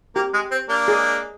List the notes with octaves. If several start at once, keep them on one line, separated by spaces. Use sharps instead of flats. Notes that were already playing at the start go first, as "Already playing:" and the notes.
A#3 G4
G#3
C4
A#3 D4
G#4